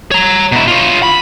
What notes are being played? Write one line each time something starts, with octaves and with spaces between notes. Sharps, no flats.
C#5 A#5
B2 E4
F4 C#5
B5